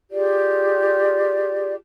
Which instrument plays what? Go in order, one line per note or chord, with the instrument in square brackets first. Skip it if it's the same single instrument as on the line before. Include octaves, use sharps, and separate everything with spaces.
[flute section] F4 G4 G#4 D5